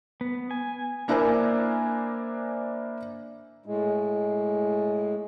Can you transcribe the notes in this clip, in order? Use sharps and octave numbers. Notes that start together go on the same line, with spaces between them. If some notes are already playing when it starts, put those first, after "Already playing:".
B3
G#5
A#3 D4 E4 A#4 C5 G#5
A2 G#3